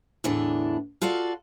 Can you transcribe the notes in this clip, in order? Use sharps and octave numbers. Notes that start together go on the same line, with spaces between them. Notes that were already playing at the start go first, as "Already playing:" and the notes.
E2 A2 D3 E3 D4
F4 F#4 A4 D5 F5